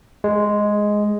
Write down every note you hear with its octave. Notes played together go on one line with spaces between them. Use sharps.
G#3